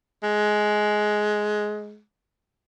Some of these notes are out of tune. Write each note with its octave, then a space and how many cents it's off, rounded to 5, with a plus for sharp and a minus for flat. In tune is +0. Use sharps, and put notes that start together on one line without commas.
G#3 +15